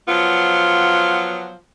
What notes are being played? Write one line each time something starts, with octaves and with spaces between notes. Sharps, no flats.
F3 F#3 B3 F4